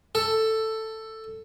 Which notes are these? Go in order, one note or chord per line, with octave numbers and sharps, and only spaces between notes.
A4